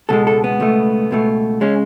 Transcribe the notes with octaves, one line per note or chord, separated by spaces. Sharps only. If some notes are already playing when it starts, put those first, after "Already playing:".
C#2 B2 G#3 A4
A4
B3
C#2 B2 A3
C#2 B2 A3
C#3 G#3 C#4